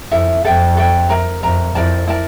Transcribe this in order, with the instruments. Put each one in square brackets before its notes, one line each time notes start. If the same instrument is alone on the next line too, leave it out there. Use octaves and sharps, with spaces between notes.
[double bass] F2 [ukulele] E4 A4 E5
[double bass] F2 [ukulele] A4 E5 G5
[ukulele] A4 E5 G5
A#4 E5 A#5
[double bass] F2 [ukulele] A#4 E5 A#5
[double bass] F2 [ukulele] E4 A#4 D5 A5
[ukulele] E4 A#4 D5 A5